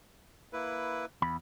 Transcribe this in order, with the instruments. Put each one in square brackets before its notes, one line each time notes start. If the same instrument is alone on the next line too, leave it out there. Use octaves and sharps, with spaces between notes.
[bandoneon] A#3 E4 B4
[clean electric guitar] E2 B5